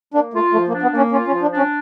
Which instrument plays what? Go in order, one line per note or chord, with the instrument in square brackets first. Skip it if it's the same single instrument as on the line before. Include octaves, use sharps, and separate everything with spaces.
[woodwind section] A#3 [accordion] D4
[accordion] A3 [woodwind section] F4
[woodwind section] F3 [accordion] A3
[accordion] A#3
[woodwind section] D4
[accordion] B3
[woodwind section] A#3
[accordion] C#4
[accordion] C#4 [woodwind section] F4
[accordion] C#4
[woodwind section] F3
[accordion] D4
[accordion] C#4 [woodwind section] D4